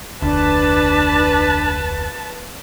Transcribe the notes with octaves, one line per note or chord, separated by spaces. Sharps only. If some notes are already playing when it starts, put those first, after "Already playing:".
F1 D2 D4 B4 A5